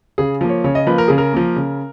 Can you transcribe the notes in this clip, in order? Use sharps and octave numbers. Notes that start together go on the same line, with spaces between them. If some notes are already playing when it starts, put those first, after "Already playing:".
C#3 G#4
F3 A#3
C#5
C#3 C#5
D#5
F3 A#3 B4
A#4
C#3 G#4
A#4
F3 A#3
C#3